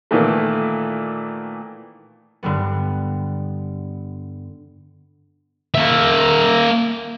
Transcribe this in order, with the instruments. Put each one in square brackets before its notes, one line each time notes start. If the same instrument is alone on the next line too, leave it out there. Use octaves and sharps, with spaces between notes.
[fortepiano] A#2 D#3 E3 A3
[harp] G2 D3 G3 B3
[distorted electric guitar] A#3 E5